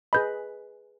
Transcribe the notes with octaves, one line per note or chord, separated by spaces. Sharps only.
G#4 B4 D#5 B5 G6